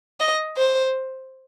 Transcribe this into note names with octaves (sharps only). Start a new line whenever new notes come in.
D#5
C5